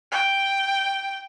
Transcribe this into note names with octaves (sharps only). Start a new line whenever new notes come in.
G5